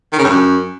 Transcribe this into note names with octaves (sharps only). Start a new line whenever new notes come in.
D#3
C#3
G2
F#2